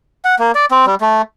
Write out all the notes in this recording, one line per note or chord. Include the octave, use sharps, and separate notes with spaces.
F#5
A#3
D5
C4
G3
A3